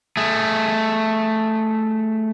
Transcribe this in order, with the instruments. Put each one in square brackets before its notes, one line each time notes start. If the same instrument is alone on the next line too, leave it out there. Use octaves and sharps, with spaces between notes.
[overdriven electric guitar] A3 G#4